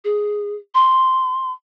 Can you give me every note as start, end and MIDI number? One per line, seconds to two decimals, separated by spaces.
0.05 0.55 68
0.75 1.52 84